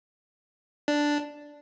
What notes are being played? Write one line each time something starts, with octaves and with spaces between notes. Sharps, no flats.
D4